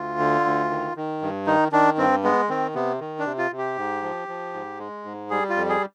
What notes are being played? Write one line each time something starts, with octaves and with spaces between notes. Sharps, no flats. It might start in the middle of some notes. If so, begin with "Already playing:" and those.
Already playing: D2 F4
D3
D2
D#3
D#3
G2
D#3 D#4
D#3 D4
G2 C4
G#3 B3
D#3 C4
C3 B3
D#3
D4
C3
F4
C3
G4
G#2
F3
F3
G#2
G#3
G#2
G3 G#4
F4
F2
G#4